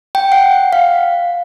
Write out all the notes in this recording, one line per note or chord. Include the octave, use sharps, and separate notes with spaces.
G5
F#5
F5